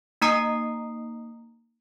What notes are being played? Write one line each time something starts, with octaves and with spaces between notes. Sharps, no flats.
A#3 D#4 A#5 D#6 C7